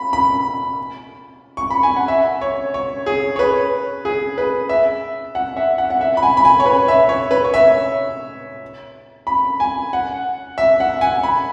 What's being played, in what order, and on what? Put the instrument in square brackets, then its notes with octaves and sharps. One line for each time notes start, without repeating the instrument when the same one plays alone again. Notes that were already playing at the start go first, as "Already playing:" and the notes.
Already playing: [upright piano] B5
B5
C#6
B5
G#5
F#5
E5
C#5
C#5
G#4
C#5
B4
G#4
B4
E5
F#5
E5
F#5
F#5
E5
B5
G#5
B5
G#5
C#5
B4
E5
C#5
B4
C#5
E5
B5
G#5
F#5
E5
F#5
G#5
B5